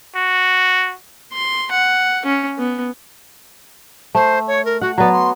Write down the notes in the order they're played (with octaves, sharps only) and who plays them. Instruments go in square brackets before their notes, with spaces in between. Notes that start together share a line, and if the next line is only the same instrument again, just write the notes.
[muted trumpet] F#4
[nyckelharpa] C6
F#5
C#4
B3
[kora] A3 [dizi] C5
[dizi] C#5
A#4
[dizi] F#4 [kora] F#5
[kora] F#3 B3 [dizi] D5
[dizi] C6